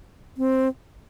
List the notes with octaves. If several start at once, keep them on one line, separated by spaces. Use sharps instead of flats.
C4